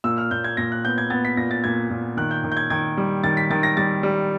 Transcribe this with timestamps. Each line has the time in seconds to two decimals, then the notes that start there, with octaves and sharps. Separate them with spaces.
0.04 A#2 E6
0.18 F6
0.31 A#2 G6
0.44 G#6
0.57 A#2 A#6
0.72 F#6
0.84 B3 G6
0.98 G#6
1.10 B3 A6
1.25 B6
1.37 A#2 A#6
1.51 A6
1.64 A#2 G#6
1.90 A#2
2.17 D#3 F#6
2.31 G6
2.44 D#3
2.52 G6
2.57 G#6
2.70 D#3 G#6
2.97 G3
3.24 D#3 A6
3.37 B6
3.50 D#3 A6
3.63 A#6
3.77 G3 A6
4.03 G3